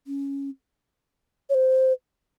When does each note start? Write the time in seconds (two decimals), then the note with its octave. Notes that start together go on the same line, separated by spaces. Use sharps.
0.07 C#4
1.50 C#5
1.54 C5